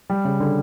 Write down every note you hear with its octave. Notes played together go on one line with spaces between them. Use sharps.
G3
C#3
D3